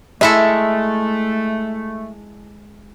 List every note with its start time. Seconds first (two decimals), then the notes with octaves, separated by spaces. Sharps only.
0.21 G#3 A3 E4 A4 E5